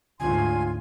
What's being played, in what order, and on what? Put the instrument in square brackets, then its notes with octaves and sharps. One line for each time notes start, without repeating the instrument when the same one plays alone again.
[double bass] D2 G#2 [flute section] C#4 F4 C6 [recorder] G#5